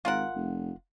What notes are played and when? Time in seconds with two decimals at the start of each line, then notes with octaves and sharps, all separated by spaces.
0.05 G#1 F4 A#4 F#5
0.35 F1